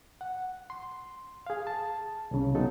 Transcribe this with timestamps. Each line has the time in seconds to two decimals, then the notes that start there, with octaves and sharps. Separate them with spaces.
0.21 F#5
0.70 C6
1.46 G#4 F5
1.67 A5
2.31 C2 C#3
2.55 B2 F#3 G#3 D#4 A4